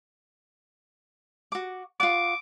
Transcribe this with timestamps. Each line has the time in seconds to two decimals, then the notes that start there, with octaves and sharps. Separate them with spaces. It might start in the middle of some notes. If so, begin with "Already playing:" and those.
1.52 F#4 D6
2.00 F4 F#5 D6